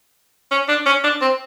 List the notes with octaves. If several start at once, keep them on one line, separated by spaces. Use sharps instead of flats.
C#4
D4
C#4
D4
C4